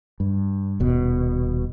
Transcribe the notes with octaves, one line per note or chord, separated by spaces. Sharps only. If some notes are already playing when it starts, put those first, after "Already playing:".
G2
D#1 B2